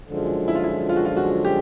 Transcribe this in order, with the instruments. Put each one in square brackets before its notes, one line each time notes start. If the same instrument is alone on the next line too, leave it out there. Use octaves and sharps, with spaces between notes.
[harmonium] F#2 D3 F3 G#3
[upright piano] E4
F4
E4
F4
F#4
F4
F#4
G4